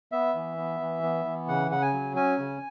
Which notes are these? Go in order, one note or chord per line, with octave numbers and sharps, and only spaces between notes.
B3 E5
E3
B3
E3
B3
E3
C#3 F#5
C#3 F#5
G#5
F#3
C#4 G#5
C#3